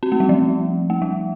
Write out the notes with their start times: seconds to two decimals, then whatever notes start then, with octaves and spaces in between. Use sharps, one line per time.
0.03 C4
0.12 A3
0.20 G3
0.29 F3
0.90 A3
1.02 G3